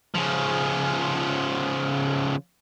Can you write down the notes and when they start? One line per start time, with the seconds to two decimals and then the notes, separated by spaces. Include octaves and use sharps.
0.15 C#3 F3